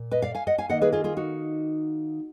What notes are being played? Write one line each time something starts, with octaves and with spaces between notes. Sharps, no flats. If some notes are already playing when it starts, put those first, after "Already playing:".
Already playing: A#2
B4 D#5
D5 F5
F5 G#5
D#5 F#5
F5 G#5
D#3 A#3 D#5 F#5
G#4 B4
F4 G#4
F4 G#4
D#4 F#4